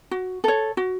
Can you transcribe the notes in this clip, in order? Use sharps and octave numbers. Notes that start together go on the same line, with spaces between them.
F#4
A4 C#5
F#4